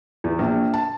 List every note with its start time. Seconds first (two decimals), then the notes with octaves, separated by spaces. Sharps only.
0.24 E2
0.39 A#1
0.74 A5